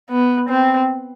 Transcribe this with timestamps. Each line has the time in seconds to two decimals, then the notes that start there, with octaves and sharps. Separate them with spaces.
0.10 B3
0.50 C4